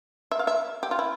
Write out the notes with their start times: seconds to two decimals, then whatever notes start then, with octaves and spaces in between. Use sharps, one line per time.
0.31 E5
0.39 F5
0.47 E5
0.83 G4
0.91 F4
0.99 E4